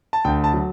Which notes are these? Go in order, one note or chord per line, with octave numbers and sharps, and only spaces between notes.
A5
D2 G5
A5
F#3